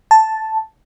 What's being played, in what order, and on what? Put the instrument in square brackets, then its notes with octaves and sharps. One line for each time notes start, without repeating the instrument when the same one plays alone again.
[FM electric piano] A5